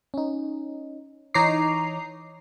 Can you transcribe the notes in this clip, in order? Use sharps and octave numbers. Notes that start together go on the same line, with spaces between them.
C#4 D#4
E3 D#4 C#5 A#5 D6 C7